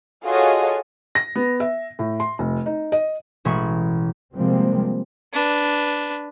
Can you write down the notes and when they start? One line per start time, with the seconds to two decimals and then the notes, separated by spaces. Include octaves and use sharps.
0.24 F4 F#4 G#4 A4 C#5 D#5
1.15 A#6
1.36 B3
1.60 E5
1.99 A2
2.20 C6
2.39 F1
2.66 D#4
2.92 D#5
3.45 A1 B2 G#3 E5 B5 C#6
4.35 C3 F3 G3 G#3 A#3 C4
5.33 D4 B4